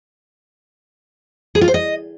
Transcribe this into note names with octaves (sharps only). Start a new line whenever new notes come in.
G#4
F4
C5
D#5